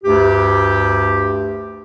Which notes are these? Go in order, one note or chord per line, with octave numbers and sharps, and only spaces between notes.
D2 G2 G4